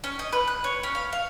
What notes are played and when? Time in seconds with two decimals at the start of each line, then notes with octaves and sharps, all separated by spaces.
0.04 C#4
0.19 D#5
0.33 B4
0.47 F#6
0.64 C#5
0.83 C#4
0.95 F5
1.13 F5